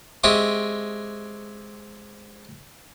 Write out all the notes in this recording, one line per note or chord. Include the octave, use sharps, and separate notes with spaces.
G#3 C4 G4 E5 C#6 D#6